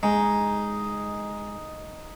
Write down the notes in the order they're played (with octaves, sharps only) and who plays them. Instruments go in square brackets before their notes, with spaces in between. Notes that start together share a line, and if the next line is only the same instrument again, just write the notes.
[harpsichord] G#3 [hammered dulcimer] D#4